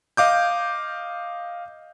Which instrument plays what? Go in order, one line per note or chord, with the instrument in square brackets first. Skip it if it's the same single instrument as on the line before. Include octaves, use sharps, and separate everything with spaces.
[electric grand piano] D#5 F5 D6 G6